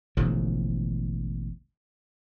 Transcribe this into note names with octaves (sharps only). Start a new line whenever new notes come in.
E1 A1 D3 F3